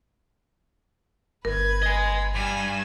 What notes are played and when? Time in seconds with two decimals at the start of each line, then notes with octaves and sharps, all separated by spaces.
1.45 G1 A#4 B4 G#6
1.83 D#5 G#5
2.35 G2 G#5 E7